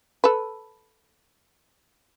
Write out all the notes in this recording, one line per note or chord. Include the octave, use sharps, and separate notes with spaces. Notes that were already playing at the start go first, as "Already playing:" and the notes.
A4 B4